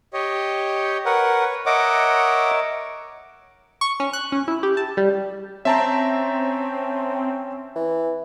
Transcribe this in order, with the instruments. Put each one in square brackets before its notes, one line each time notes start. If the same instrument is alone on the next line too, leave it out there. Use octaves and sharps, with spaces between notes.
[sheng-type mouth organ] G4 C#5 D#5
[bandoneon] A#4 F#5 [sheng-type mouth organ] B4 C#5
[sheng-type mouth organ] A#4 C#5 E5 [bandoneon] D#5 F#5 D6
[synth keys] C#6
C#4
F#6
C#4
E4
G4
A5
G3
[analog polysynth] C4 [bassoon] C#4 [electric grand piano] E5 A5 A#5
[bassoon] E3